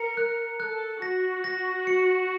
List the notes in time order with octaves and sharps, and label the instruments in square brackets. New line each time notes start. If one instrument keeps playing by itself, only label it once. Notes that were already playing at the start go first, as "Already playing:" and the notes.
Already playing: [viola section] A#4 [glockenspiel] C#7
[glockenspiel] F#6
[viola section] A4 [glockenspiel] F#6
[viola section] F#4 [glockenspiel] A#6
[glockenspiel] A#6
C#7